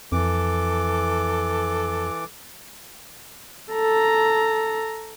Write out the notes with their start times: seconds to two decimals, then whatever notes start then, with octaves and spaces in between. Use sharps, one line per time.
0.12 F2 E3 A4 D6
3.73 A4 A#5